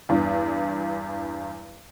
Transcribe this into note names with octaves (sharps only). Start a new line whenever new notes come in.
E2 G2